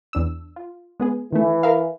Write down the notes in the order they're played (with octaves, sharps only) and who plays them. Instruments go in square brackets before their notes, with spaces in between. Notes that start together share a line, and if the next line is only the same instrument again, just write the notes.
[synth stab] E2 D4 E6
F4
G#3 B3 G#4
[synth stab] D#3 A3 [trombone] E3
[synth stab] A#4 E5 F5